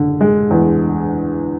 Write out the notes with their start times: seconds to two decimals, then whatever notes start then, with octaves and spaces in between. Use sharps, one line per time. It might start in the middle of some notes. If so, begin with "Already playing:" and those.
Already playing: F#1 D3
0.21 G#3
0.51 E2